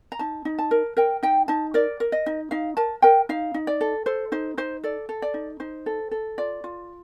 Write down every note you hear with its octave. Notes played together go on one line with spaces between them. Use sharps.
A#5
D#4 A5
D#4
A5
A#4
A#4 G5
D#4 G5
D#4 A5
A#4 D5
A#4
D#5
D#4
D#4 F5
A#4 A5
A#4 G5
D#4 F5
D#4
D5
A4
A4 C5
D#4 C5
D#4 C5
A4 D5
A4
D5
D#4
D#4 C5
A4
A4
F4 D5
F4